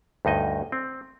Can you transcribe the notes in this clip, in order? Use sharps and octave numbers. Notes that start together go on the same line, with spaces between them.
D2 G2 D#4 D#5 G#5
C4